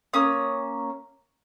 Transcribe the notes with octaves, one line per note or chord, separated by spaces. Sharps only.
A#3 C#4 D#6